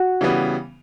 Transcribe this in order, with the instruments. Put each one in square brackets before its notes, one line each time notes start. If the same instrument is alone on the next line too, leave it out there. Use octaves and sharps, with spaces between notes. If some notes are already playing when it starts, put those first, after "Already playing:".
Already playing: [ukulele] F#4
[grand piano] C#3 E3 G3 B3